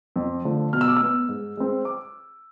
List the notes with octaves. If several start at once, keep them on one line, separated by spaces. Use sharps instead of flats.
F2
D3 F3 A3
B2 F6
E6
D6
E6
B3
G#2
G#3 C4
D6